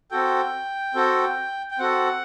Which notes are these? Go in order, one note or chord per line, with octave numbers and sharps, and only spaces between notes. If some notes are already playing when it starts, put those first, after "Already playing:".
C4 F#4 A4 G5
C4 F#4 A4
G5
C4 F#4 A4 F#5